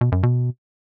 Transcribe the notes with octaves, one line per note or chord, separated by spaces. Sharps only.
B2
F#2
B2